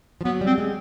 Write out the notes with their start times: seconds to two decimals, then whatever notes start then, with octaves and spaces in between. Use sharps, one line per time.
0.21 F3
0.25 F#3 B3
0.41 G3 C4
0.58 G#3